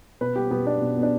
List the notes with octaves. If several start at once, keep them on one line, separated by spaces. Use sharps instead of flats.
B2 B4
B3 G4
B2 B3
B3 D4
B2
B3
D4